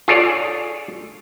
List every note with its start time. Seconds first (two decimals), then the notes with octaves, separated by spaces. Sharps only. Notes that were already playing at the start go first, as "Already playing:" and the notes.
0.08 F4 G#4 A4 C#5 D5